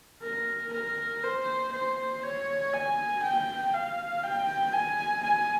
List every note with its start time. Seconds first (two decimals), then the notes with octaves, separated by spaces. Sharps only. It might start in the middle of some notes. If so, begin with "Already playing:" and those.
0.23 A#4
0.73 A#4
1.24 C5
1.73 C5
2.23 C#5
2.73 G#5
3.23 G5
3.73 F5
4.23 G5
4.73 G#5
5.24 G#5